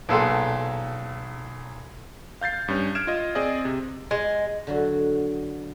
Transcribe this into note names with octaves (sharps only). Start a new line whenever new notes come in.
B1 A#2 G#4 A4 F#5 C6
F5 G6 A6 C7
G2 C#4
F6 G#6 D7 E7
F4 D#5
C4 G#4 D5 D#5
C3
G#3
D3 F#3 F#4